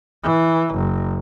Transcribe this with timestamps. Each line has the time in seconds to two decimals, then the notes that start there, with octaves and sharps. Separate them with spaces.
0.23 E3
0.74 F#1